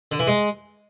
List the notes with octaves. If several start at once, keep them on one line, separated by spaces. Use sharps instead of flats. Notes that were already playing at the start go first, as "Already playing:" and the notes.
D3
E3
G#3